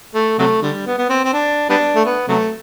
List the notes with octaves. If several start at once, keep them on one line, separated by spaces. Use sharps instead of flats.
A3
C3 F#3 A3
D3 G3
B3
B3
C4
C4
D4
G3 B3 D4
A3
B3
C3 F#3 A3